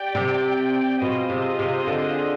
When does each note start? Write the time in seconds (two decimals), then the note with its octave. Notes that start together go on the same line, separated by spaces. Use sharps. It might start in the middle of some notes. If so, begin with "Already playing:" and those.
Already playing: G4 D5 G5
0.15 C3
1.01 B2 C4 F4 G#4 C5 D#5
1.30 C3
1.59 C3
1.87 D3